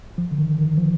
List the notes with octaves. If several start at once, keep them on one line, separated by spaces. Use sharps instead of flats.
F3
D3
D#3
D#3
F3